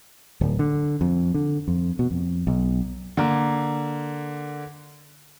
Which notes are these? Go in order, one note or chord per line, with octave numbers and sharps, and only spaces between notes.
D1
D3
F2
D3
F2
B2
F2
B1
D3 A#3